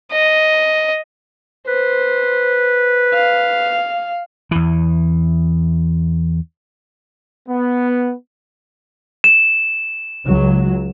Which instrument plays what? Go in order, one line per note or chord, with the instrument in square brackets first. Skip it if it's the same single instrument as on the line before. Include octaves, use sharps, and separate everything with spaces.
[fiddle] D#5
[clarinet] B4 [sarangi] C5
[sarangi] F5
[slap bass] E2 E3
[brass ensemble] B3
[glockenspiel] E7
[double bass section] C#2 F#3